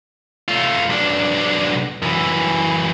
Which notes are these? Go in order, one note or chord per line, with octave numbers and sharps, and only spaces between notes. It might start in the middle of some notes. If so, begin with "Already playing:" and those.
A3 F4
B1 D4
F#2 E3